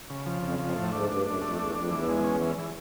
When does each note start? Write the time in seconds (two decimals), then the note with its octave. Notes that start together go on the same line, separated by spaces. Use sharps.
0.10 C#3
0.26 F3
0.42 F2 C#3
0.59 F2 F3
0.75 A2 A3
0.92 G#2 D4
1.09 G2 D4
1.25 F#2 D4
1.42 F2 A3
1.58 E2 D4
1.74 F2 D4
1.91 E2 E3
2.08 G#3
2.24 C#4
2.41 E3
2.58 E3